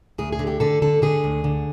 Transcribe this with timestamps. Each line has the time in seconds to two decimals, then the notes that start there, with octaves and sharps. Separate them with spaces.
0.18 D2 G#4
0.32 G#4
0.39 D3
0.47 G4
0.60 D3 A4
0.82 D3 A4
1.02 D3 G#4
1.24 D2
1.44 D3